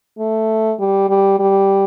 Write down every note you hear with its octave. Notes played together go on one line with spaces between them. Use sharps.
A3
G3
G3
G3